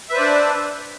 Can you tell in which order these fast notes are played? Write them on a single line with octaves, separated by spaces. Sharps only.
E5 B4 C5 D5 D4